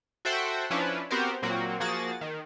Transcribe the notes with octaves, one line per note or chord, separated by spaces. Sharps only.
F#4 A4 C5 E5 F#5 G5
F3 C#4 D4 E4 B4
B3 C4 F#4 G4 A#4 C5
A#2 F#3 A#3 C4 F#4
F3 A#3 F#4 G#4 A6
D#3